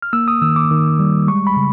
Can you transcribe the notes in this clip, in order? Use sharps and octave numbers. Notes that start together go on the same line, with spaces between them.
F6
A#3 E6
D#6
D#3 E6
D6
D#3
G3
G#3 C#6
B5
C#3